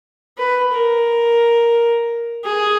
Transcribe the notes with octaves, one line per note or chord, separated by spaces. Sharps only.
B4
A#4
G#4